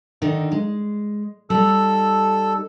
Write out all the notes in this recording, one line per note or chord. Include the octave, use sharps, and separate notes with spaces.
D3 D#3 D#4
G#3
G3 D#4 A4 E6